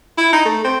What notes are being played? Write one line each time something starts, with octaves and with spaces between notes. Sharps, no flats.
E4
D#4
A3
C4